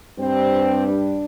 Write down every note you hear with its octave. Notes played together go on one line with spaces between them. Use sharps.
G2 G3 C4
D4